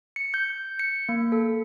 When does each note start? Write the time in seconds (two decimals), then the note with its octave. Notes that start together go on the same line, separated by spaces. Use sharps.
0.16 C#7
0.34 G6
0.79 C#7
1.09 A#3
1.32 A4